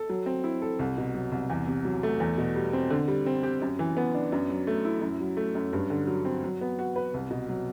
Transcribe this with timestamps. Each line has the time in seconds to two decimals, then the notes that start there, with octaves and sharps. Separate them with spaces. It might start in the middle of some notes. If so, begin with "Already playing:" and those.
Already playing: A4
0.09 F#3
0.26 C4
0.44 E4
0.62 A4
0.79 C2
0.98 B2
1.14 F#3
1.32 C2
1.50 E2
1.67 C3
1.85 F#3
2.03 A3
2.20 E2
2.38 B2
2.56 G3
2.73 C4
2.90 D3
3.08 G3
3.26 C4
3.43 G4
3.62 F#2
3.79 E3
3.97 B3
4.14 D4
4.32 F#2
4.50 F#3
4.67 A3
4.85 E4
5.02 F#2
5.20 F#3
5.37 A3
5.55 F#2
5.73 G2
5.90 D3
6.07 F#3
6.25 C4
6.44 F#3
6.61 B3
6.79 F#4
6.96 B4
7.14 C2
7.31 B2
7.49 F#3